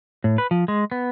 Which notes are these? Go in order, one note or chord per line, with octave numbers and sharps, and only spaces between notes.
A2
B4
F3
G#3
B3